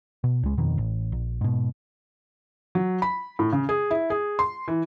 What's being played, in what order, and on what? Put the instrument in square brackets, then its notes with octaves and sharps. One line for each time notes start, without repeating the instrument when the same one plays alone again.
[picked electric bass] B2
C#2 G#3
G1 F2 B2 D#3
A1
A#1
G#2 B2
[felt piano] F#3
B5
A2
C#3
G#4
E4
G#4
C6
E3